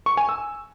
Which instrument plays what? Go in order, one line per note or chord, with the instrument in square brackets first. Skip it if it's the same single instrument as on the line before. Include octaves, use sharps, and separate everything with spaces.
[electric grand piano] C#6
G#5
E6